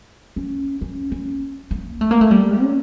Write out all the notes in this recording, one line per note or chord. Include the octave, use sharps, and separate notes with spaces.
C#4
C#4
C#4
A#3
A3
A#3
A3
G3
C#4